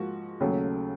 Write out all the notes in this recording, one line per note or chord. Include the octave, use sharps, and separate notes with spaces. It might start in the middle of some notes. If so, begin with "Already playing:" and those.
Already playing: G#2 F3 A#3 F#4
D#2 C#3 F#3 A3